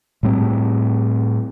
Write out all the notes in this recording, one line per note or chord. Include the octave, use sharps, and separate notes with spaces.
A2 G3 C4